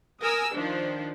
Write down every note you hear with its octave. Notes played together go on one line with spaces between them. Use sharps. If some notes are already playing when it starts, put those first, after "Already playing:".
A#4 G#5 D#6 E6
D#3 F3 D4